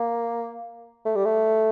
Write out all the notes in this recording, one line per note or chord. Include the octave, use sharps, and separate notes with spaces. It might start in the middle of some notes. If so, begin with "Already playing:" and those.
Already playing: A#3
A3
G3
A3